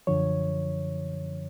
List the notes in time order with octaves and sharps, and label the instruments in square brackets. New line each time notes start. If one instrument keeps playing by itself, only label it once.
[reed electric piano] F#2 D3 F3 C#5